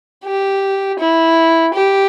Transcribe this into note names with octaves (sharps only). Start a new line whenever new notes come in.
G4
E4
G4